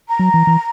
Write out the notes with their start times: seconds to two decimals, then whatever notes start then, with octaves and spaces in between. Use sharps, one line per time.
0.09 A#5
0.19 F#3
0.34 E3
0.47 E3